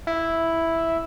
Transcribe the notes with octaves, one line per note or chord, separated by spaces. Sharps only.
E4